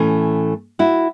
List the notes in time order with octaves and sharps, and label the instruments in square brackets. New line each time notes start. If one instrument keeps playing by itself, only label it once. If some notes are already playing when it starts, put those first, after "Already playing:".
Already playing: [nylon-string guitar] A2 E3 A3 C#4
E4 F#4